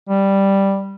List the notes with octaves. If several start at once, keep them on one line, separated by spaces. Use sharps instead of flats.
G3